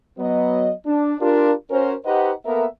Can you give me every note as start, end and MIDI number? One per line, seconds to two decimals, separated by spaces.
0.18 0.71 54
0.18 0.71 59
0.18 0.71 75
0.86 1.15 62
1.20 1.51 62
1.20 1.51 65
1.20 1.51 67
1.20 1.51 70
1.70 1.94 61
1.70 1.94 66
1.70 1.94 70
1.70 1.94 72
2.05 2.32 63
2.05 2.32 67
2.05 2.32 71
2.05 2.32 72
2.05 2.32 75
2.05 2.32 78
2.45 2.65 58
2.45 2.65 59
2.45 2.65 69
2.45 2.65 70
2.45 2.65 76